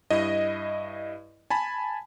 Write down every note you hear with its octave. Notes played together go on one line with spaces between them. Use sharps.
G2 E4 D#5
G#5 A5 B5